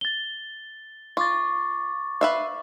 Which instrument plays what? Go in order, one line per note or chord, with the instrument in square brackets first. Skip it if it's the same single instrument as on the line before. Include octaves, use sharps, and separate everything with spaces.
[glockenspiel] A6 G7
[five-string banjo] F4 [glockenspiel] C#6 D6 A6
[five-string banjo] B4 E5 F5